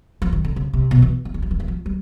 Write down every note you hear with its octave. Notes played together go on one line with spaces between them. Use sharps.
F3
D#3
D3
C#3
C3
B2
E3
E3
D#3
F3
E3
D#3
F3
G3